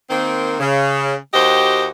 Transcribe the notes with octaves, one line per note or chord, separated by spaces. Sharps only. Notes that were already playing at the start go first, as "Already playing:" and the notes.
D#3 A#3 C4
C#3
D#2 F#4 G4 C5 D#5